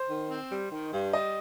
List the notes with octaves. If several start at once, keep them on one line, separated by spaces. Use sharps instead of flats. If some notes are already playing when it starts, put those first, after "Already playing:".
Already playing: C5
D#3
C4
G3
D#3
G2
G3 D#5